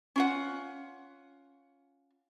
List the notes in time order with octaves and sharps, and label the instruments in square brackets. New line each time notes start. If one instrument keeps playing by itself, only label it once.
[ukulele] C#4 F4 F#5